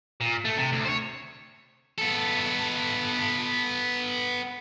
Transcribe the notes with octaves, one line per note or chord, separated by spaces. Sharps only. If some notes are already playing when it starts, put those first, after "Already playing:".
A#2
A3
C3
D2
C5 C#5
B3 A4